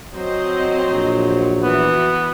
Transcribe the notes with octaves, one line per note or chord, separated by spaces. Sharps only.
F#3 C4 C5 D#5
A#1
E3 B3 F#4